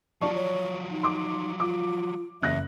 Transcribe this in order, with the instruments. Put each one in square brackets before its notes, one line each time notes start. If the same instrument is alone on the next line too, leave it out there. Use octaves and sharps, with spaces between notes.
[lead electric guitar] F3 F#3 [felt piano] F4 D5 C#6 [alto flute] A5
[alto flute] C#5
D#4
[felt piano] C6 D6
[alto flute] F4 [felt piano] D6
[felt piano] F#1 F#6 A#6 [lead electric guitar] E2 [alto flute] E5